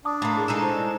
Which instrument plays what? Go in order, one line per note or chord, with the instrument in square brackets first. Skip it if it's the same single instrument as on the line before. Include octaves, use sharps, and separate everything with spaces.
[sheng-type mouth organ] D4 [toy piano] A5 D6 D#6
[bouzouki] A2 A#3
[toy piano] E4 G#4 A#4
[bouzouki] G#3 D#4 A4
[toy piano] E4 C5
E4